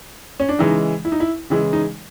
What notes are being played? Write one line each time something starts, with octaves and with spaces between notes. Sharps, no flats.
C#4
D4
C#3 E3 G#3 D#4
E4
D#4
E4
C#3 E3 G#3 E4
D#4